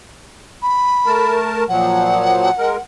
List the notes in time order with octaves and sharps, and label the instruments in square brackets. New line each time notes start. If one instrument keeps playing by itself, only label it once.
[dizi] B5
[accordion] A3 A#4 A5
[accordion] A#2 F3 F#3 [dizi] F#5
[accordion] G#3 A#4